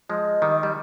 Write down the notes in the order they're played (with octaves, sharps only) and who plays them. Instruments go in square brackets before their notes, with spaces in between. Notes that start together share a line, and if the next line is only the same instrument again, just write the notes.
[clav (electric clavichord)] F3 G#3 [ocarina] D#5
[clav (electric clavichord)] D#3 G3
G3